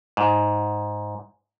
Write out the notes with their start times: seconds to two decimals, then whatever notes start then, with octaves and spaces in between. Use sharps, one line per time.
0.17 G#2